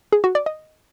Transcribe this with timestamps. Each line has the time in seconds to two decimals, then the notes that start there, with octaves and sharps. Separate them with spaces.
0.12 G#4
0.24 F#4
0.35 D5
0.46 D#5